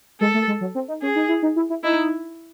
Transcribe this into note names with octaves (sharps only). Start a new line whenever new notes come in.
G#3 A4
A3
G#3
F#3
C4
D#4
C#4 G#4
D#4
E4
D#4
E4
E4
D#4 E4